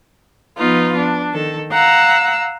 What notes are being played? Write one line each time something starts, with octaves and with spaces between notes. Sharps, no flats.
F3 B3 D#4 F4 B4
D4
D#3 A4
F5 F#5 A#5 E6